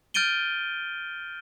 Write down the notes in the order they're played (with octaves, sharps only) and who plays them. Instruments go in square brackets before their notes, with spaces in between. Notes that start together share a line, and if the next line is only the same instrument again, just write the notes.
[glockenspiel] F6 G6 A6 D7 D#7 G7